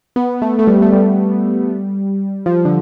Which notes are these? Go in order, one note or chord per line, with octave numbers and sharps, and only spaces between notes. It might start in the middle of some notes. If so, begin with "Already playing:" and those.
B3
A3
A3
G3
A3
G3
F3
D3